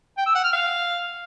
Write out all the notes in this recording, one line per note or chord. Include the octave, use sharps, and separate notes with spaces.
G5
E6
F#5
F6
F5